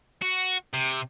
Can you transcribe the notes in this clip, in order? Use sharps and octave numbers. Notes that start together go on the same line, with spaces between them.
F#4
C3